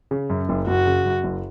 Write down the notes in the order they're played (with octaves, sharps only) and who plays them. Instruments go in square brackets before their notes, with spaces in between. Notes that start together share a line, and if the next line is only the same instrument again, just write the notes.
[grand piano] C#3
F#2
F#1
[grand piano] F#1 [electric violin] F#4
[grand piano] C#3
F#2
F#1